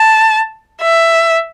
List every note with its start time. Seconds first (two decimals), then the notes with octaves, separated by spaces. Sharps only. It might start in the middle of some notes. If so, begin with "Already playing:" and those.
Already playing: A5
0.82 E5